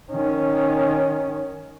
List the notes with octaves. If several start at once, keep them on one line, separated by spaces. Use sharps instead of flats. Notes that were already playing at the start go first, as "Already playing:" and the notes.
D#3 C#4